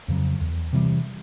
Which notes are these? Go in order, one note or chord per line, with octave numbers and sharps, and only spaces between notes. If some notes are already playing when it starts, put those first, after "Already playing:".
F2 C#3 F#3
E2
C3 E3 G3